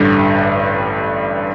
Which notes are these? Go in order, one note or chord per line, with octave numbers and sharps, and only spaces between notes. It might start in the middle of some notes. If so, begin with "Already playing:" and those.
Already playing: A1 G2 D3 G3